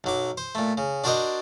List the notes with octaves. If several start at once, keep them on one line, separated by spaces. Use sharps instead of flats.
B1 F#3 D6
C5
A#2 A3
C#3
D4 F#4 A#4 C5 D5 D#5